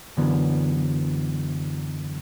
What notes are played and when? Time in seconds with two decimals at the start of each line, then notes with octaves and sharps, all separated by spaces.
0.17 F#2 D3 E3 F#3 B3